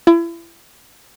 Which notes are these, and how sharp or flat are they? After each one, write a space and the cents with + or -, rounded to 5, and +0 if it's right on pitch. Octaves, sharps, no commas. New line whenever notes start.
E4 +35